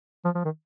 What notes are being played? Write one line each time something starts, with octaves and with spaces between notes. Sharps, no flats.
F3
F3
D#3